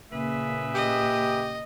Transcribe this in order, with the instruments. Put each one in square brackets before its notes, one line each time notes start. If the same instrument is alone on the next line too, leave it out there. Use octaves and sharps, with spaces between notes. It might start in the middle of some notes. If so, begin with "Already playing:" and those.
[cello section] A#2 C#3 A#3 [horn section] G#4 B4 E5
[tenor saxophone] G4 [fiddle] D#5